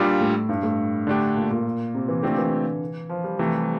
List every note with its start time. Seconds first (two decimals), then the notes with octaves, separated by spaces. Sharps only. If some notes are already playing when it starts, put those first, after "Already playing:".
Already playing: A#2 G3 D4 F4
0.20 A2
0.49 G2
0.63 A2
1.07 D3 A3 D4 G4
1.36 A#2
1.51 A#2
1.95 C3
2.08 E3
2.22 A#2 D3 A3 C4 G4
2.38 E3
3.09 F3
3.24 G3
3.39 C3 E3 F3 A3
3.53 G3